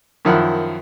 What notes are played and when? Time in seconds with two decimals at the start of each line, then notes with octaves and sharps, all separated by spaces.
0.25 F#2 D#3 F3 E4 F#5